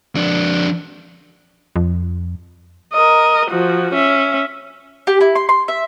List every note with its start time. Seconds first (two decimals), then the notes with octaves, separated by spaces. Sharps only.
0.15 F2 D4
1.76 F2
2.94 A#4 D#5
3.50 F3 F#4
3.93 C#4 E5
5.07 G4
5.21 E4
5.35 C6
5.49 C6
5.68 E5